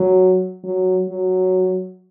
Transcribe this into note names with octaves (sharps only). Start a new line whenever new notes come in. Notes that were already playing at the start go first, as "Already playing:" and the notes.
Already playing: F#3
F#3
F#3